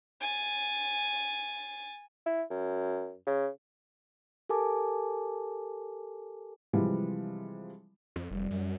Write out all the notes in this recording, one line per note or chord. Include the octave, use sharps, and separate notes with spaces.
G#5 A6
E4
F#2
C#3
G4 A4 A#4 G#5 A5 D6
C3 E3 F3 G3 G#3
F2
F1 G3
F#2